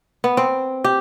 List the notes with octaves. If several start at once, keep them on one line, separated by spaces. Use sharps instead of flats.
B3
C4
G4